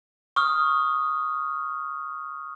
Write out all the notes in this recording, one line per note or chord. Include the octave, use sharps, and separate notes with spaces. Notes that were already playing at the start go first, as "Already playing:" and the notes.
C#6 D#6 F6